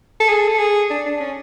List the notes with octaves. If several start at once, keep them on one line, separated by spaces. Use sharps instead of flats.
A4
G#4
A4
G#4
D4
D4
C#4